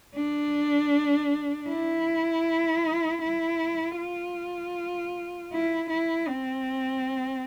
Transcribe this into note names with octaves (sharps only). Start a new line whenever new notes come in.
D4
E4
E4
F4
E4
E4
C4